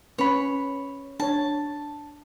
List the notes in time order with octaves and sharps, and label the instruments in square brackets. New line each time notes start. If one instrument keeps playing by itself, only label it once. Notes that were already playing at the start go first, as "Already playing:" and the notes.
[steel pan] C#4 B4 [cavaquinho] C#5 B5
[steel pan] D4 C#5 [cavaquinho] A5